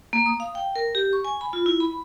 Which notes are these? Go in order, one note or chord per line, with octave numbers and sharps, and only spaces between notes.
A#3
D#6
F5
G5
A#4
G4
C#6
G#5
B5
F4
E4
B5